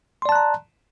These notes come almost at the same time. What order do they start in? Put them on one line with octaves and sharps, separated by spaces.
C6 D5 A5 F#6 A#5